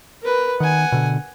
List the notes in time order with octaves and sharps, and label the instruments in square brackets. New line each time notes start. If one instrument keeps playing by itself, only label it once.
[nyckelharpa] A#4 B4
[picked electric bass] D#3 [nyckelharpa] F#5 G#5
[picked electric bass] B2 D3